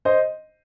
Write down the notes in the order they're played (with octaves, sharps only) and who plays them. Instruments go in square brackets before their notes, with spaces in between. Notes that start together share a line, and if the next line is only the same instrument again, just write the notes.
[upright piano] C5 D#5